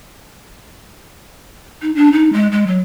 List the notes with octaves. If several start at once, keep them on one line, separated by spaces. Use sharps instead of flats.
D#4
D4
D#4
G#3
G#3
F#3